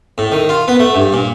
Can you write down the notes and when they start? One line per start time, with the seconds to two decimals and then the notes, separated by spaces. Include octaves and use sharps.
0.18 A2
0.32 D#3
0.49 F4
0.68 B3
0.79 A3
0.95 G2
1.13 A#2